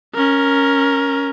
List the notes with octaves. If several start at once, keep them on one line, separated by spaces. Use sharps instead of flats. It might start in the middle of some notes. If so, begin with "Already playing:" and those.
C#4 A#4